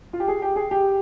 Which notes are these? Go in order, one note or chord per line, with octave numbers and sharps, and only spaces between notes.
F4
G4
G#4
G4
G#4
G4